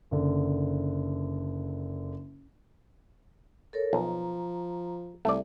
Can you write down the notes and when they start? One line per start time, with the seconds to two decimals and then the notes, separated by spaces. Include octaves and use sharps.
0.11 F#1 D3
3.73 A4 A#4 C#5
3.93 B1 F3 A#5
5.25 C2 A3 D5